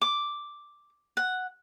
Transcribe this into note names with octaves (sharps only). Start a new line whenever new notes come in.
D6
F#5